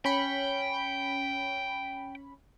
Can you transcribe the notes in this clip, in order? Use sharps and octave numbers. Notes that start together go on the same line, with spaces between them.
C#4 G5 B5 C#7